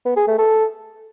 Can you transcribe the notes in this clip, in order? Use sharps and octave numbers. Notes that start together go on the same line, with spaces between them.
B3
G#4
A3
A4